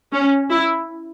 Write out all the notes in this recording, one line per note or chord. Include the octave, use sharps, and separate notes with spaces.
C#4
E4